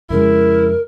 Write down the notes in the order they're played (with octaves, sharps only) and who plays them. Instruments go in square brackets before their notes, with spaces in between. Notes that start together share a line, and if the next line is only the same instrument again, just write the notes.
[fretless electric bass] F2 C#3 G#3 [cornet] E4 [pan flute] A#4